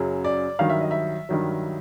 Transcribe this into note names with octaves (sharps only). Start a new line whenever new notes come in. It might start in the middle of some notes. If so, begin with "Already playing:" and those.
Already playing: F#2 C#3 F#3
D5
G2 D#3 F#3 F5
E5
D#5
E5
G2 D#3 F#3